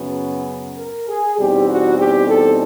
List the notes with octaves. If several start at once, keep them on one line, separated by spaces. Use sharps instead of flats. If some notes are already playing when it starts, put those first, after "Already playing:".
Already playing: F#2 C#3 F#3 B3
A#4
G#4
E2 B2 G3 C4 D#4 G4
F#4
G4
A4